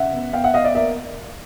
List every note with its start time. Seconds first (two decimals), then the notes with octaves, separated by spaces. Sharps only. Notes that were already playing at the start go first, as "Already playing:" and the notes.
Already playing: C#3 E5 F#5
0.13 B3
0.33 B3 F5 G5
0.44 E5 F#5
0.54 B3 D#5 F5
0.64 D5 E5
0.75 A#3 D5 E5